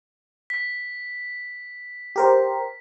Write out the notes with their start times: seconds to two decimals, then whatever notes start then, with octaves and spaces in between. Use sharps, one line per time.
0.50 B6
2.16 G4 A#4 C5